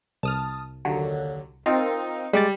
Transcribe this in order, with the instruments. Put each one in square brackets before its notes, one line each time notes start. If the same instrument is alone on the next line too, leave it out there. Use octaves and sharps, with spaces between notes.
[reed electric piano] C2 [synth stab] A5 D#6 F6
[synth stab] D#2 D3 F#3
[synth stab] C4 F4 A#4 [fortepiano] D#4
[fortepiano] G3 [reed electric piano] G#3 D6 A6